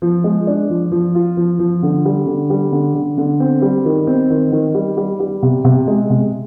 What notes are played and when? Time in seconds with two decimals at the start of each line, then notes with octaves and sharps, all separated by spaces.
0.02 F3
0.24 G#3
0.47 D4
0.70 F3
0.92 F3
1.15 F4
1.37 F3
1.59 F3
1.83 D3
2.05 G3
2.26 D3
2.50 G3
2.72 D3
2.94 D3
3.18 D3
3.40 C4
3.62 G3
3.85 D#3
4.07 C4
4.30 D#3
4.52 D#3
4.74 G3
4.97 G3
5.20 G3
5.43 C3
5.65 C3
5.87 G#3
6.10 C3